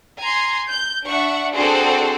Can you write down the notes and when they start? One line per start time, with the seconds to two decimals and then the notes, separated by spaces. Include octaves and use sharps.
0.19 G#5 A#5 C6
0.71 G6
1.06 D4 E5 F#5 C#6
1.55 C4 D4 F#4 G#4 A4 C5